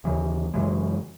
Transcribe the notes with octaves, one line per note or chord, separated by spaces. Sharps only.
D#2 C#3 E3
F#2 C#3 E3 G#3